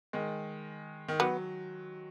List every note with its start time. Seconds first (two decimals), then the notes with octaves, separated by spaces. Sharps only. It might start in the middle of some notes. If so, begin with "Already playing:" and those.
0.13 D#3 G#3
1.08 D#3
1.20 F#3 B3